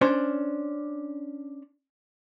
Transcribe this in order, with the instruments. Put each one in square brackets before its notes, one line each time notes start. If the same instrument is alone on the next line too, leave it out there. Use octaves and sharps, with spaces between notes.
[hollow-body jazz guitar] C#4 D4 C5